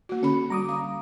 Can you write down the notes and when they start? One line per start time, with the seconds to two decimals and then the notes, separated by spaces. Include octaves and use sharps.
0.09 A#3 F#4
0.23 D3 C#4 B5
0.50 G3 A#5 D6 D#6
0.68 F5